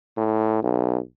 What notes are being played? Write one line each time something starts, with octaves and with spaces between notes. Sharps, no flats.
A2
B1